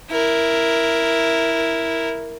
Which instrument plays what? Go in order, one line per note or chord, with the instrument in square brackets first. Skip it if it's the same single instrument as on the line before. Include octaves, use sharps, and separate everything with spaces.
[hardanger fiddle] E4 A#4